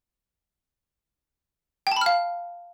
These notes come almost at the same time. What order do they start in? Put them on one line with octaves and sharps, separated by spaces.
G5 A5 B5 F6 F5